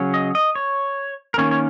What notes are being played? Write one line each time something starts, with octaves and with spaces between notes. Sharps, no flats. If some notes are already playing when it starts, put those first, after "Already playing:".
Already playing: C#3 F#3 C#4
D#5
D#5
C#5
A#4
D#3 A#3 C#4 C#5
C#5